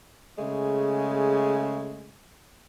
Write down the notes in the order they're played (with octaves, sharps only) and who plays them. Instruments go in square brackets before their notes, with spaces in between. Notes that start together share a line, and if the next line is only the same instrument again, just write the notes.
[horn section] C#3 G#3 A3